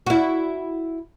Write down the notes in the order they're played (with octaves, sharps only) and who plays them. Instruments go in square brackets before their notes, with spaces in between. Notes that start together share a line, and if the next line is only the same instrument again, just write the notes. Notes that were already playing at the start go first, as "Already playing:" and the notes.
[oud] E4 F#4